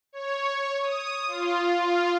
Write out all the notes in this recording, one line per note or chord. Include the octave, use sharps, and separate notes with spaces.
C#5
D#6
F4